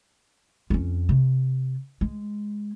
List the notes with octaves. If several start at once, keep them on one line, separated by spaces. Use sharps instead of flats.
F2 C#4
C3
G#3